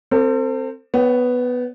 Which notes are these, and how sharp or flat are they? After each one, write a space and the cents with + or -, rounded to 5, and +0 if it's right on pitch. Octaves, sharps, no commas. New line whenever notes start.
C4 +0 A4 +40
B3 +5 C#5 +20 G5 -35